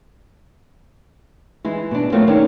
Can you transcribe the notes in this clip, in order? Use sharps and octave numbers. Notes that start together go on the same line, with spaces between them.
E3 G#3 E4
B2 D4
F3 F#3 A3 A#3 C4 F4
D#3 C#4 G#4 A#4 D5